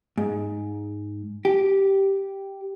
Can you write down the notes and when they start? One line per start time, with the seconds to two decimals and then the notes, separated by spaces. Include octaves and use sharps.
0.17 G#2
1.45 G4